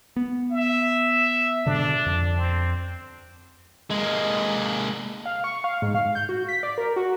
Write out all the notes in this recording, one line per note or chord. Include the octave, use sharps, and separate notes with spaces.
B3
E5
G#2 B2 D3 D4
F2
C4
G#3 A#3
F5
C#6
F5
G#2
F5
G6
F#4
B6
D5
A#4
F#4